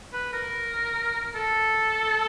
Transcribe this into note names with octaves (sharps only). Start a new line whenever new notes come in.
B4
A#4
A4